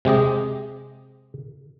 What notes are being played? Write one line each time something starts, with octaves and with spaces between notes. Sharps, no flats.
C3 G#3 G4 D#5